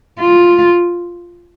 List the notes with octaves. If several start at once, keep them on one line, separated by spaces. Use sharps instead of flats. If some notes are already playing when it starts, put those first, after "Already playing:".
F4